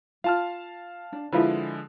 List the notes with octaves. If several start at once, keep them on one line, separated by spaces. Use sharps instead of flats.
F4 F5 A5 F6
D4
D3 F3 G#3 E4 F4 B4